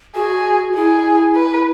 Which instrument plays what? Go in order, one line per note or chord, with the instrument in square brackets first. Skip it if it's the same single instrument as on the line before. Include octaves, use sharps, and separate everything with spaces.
[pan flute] F#4 [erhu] G#4
[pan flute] E4 [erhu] G#4
[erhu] B4